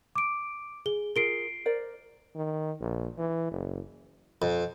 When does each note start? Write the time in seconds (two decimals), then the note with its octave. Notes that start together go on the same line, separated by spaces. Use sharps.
0.15 D6 D7
0.86 G#4 G7
1.16 F4 G#4 A#4 C7 D7 G7
1.66 A#4 C5 D5
2.35 D#3
2.80 A#1
3.18 E3
3.51 F#1
4.42 F2